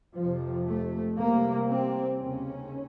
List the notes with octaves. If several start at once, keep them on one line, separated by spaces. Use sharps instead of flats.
F2 C3 F3
A3
C2 C3 A#3
C4
D#2 C#3 C#4